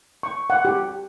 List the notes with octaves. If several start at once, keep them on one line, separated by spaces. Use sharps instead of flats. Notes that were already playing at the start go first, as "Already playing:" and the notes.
C#6
F#5
G4